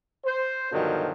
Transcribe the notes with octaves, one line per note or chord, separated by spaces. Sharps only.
C5
G2 B2 D3 D#3 F3 F#3